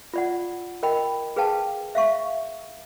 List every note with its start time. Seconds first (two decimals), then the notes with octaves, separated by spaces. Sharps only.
0.14 F4 D5 F#5
0.83 A#4 D#5 G5 B5
1.36 G#4 B4 F5 G5 A5
1.95 E5 F5 C#6